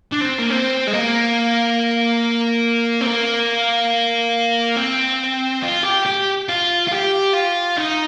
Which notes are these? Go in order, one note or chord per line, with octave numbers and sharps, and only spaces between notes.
D4
C4
A#3
C4
G#3
A#3
C4
A#3
C4
F4
G4
G4
F4
F4
G4
F4
D#4